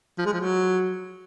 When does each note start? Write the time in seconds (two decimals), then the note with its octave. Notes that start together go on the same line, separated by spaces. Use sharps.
0.18 F3
0.26 G#3
0.33 F3
0.40 F#3